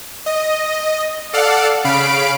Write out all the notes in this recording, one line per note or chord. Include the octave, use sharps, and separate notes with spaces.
D#5
A4 D5 F5 F#5
C#3 F5 B5 D7